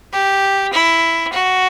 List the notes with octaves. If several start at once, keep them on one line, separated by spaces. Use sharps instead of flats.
G4
E4
F#4